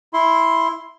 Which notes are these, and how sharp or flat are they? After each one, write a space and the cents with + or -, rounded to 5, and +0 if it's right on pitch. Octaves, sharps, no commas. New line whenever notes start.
E4 +0 C6 +0